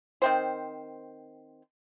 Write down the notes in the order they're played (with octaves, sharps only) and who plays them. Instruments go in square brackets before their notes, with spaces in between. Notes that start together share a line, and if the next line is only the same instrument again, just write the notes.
[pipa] D#3 C4 C5